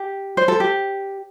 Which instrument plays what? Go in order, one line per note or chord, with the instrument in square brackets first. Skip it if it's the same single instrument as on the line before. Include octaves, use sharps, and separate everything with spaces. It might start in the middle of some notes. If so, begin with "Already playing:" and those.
Already playing: [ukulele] G4
C5
A4
G4